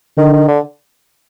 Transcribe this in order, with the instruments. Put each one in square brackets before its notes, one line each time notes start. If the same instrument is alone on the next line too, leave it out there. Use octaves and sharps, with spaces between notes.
[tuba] D3 [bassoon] D#3
[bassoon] D#3
D3